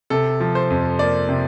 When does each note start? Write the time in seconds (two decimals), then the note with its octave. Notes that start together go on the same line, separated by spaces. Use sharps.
0.10 C3 A4
0.40 F3
0.55 C5
0.70 F2
0.99 A#3 D5
1.29 C3